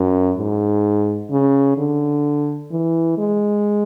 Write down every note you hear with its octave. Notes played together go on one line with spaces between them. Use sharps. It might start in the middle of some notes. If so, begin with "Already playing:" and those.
Already playing: F#2
G#2
C#3
D3
E3
G#3